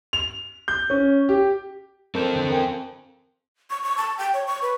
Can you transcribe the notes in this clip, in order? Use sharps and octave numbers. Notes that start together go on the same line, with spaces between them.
F7
G6
C#4
G4
C4 A4 A#4 G6
D3
A#4 G5 G#5
C#6
C#6
A5
G5
C#5
C#6
B4